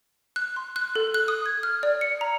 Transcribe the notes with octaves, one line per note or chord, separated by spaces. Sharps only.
F#6
C6
F#6
A4
F#6
D#6
G#6
F6
D5
C#7
A#5